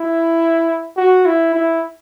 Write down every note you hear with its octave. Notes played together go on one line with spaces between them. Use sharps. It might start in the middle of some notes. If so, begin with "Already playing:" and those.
Already playing: E4
F#4
E4
E4